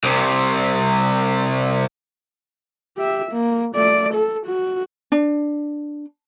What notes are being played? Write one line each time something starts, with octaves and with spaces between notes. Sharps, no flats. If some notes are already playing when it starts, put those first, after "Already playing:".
C2 C3
G4 E5
A#3
A3 D5
A4
F#4
D4